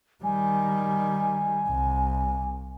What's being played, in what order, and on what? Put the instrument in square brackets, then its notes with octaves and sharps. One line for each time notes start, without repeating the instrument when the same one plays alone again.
[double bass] D#3 G3 [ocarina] G#5
[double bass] C2